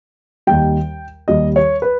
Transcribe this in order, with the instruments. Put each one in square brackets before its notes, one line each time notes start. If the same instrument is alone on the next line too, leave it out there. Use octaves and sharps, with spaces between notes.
[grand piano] D#2 D#3 G3 G5
D#2 D#3 G3 D#5
C#5
B4